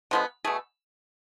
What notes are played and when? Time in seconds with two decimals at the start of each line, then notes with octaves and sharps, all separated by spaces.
0.11 D3 F3 G#3 B3
0.44 B2 A3 G#4